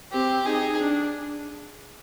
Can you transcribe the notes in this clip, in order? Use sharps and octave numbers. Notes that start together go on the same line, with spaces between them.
C4 G4
D#4 G#4
D4